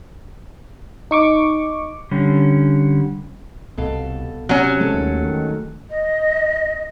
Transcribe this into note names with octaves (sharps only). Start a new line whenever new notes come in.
D#4 C#6 D6
D3 G3 C#4
C2 B2 A4 F5
C3 F#3 C#4
G#3 A3 A4
D#2
D#3
D#5